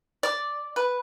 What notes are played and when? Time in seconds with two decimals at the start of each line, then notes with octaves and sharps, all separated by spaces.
0.23 D5
0.76 B4